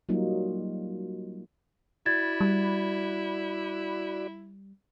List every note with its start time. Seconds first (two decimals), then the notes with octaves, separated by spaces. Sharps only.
0.09 F#3 G3 A#3 D#4 F4
2.06 E4 F#4 D5 B5 G#6 A6
2.41 G3